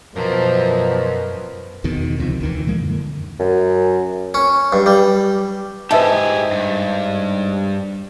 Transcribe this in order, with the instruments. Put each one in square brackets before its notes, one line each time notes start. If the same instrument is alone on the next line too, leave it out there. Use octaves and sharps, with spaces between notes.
[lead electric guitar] F#2 A#5 [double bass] B2 [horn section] F3 [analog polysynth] A#4 C5
[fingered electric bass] E2 B2 D#3
C#2 C3 D#3 F3
D2 D#3 E3
B2 F3 G#3 A#3
F#2 D3
[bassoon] F#2
[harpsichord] C#4
G2
G3
[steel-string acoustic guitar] G#2 [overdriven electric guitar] G4 G#4 [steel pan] B4 E5 A5
[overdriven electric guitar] G2